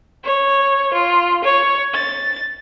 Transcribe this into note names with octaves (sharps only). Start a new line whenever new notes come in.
C#5
F4
C#5
A6